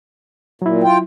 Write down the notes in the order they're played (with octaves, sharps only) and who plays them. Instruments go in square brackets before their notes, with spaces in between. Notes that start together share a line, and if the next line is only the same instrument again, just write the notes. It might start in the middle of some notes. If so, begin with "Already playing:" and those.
[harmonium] A#2 [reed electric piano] F#3 E4
[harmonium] F4 G5